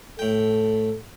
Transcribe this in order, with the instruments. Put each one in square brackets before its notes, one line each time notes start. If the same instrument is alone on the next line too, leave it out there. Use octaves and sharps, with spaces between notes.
[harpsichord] A2 G5 [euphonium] A4